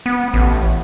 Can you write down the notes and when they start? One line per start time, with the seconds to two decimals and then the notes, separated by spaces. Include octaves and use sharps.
0.06 B3
0.34 A1